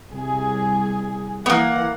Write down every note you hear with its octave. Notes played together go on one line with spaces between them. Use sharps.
C2 G#4
E3 A#3 B3 F#5